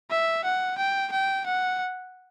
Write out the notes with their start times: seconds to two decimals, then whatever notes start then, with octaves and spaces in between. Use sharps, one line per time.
0.11 E5
0.44 F#5
0.78 G5
1.12 G5
1.46 F#5